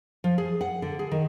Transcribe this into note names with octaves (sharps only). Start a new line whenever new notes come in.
F3
G#4
F#5
D3
G#4
D#3